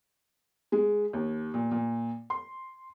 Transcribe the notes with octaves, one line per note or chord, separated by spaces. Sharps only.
G#3
D#2
A#2
A#2
C6